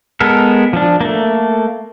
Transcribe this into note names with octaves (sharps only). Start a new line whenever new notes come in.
G#3 B3 A4 A#4
F3 D4
A3 A#3